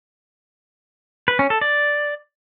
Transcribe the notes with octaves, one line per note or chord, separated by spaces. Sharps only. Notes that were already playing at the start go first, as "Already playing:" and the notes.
B4
C#4
A4
D5